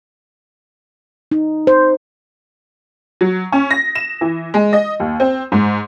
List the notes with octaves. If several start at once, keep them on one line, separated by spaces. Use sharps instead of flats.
D#4
C5
F#3
C#4
A#6
E7
E3
G#3
D#5
D#2
C4
G#2